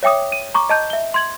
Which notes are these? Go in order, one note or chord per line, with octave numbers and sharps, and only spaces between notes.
C#5 E5 G5 D6 D#6
D#7
A#5 C#6 D6
D#5 A5 G6
E5 G7
C6 G#6 F#7